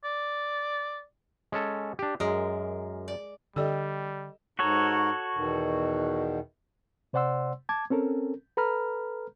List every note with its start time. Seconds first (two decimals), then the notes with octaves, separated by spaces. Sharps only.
0.05 D5
1.52 G#3 C#4 A4
1.99 D4 G4
2.20 F#2 G#3 A#4
3.08 D5
3.56 D3 G3 G4 A4 D5 D#5 G5 E6
4.59 G#2 F#4 A4 A#4 C#5
5.35 E2 B2 D#3
7.13 C3 C5 D5 F#5 C6 E6
7.69 A5 D6 G#6
7.90 C4 C#4 A4 A#4
8.57 A4 B4 A#5 B5 F6